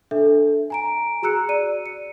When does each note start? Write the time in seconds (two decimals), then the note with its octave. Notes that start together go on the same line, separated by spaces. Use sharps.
0.11 D4 A4 E5
0.70 G#5 A#5 D7
1.22 F#4 G#4 A#5 E6 F#6 C#7
1.49 D5 D#7
1.86 C#7